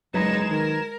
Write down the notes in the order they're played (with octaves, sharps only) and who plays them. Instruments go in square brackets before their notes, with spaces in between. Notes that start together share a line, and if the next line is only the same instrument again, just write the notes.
[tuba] F#1 [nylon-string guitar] F#3 B4 [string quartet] G#3 D#4 [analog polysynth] A#5 G#6 E7
[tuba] D#3 [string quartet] A#4